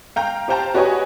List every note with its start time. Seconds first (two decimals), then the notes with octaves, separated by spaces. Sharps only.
0.16 F5 G5 A#5
0.48 G4 C5 F5 G5 A5 A#5
0.74 F#4 G4 B4 C#5 D#5 G#5